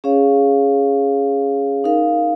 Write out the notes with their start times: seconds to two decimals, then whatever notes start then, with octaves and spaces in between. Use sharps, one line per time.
0.04 C#4 G#4 C#5 F5
1.84 D#4 A#4 F5